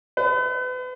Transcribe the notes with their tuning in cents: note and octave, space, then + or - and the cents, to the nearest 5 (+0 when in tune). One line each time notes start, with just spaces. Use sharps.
B4 +35